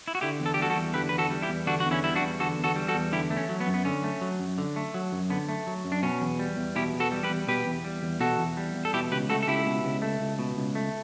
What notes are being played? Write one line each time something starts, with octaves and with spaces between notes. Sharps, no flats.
E4
F#4
D3 E4 G4
E2
A4
G4
G3 F#4 A4
F#4 A4
E2
D3 G4 B4
E2 B4
F#4 A4
G3
E4 G4
E2
D3 D4 F#4
E2 F#4
C#4 E4
G3 E4
D4 F#4
E2
D3 F#4 A4
E2
F#4 A4
G3
F#4 A4
E2
D3 E4 G4
A3
C#4
F#3
B3
F#2
B3
D3 C#4
A3
F#3
F#2
D3
A3
F#3
F#2
D3 B3
A3
F#3
F#2
D4
B2 C#4
E2
G3
E2
B2 E4 G4
E2
F#4 A4
G3
G4 B4
E2
B2 G4 B4
E2
G3
E2
B2 F#4 A4
E2
G3
E2
A4
B2 E4 G4
C#2 G4 B4
A3 F#4 A4
A4
C#2 E4 G4
B2
C#2
A3
C#2
B2
C#2
A3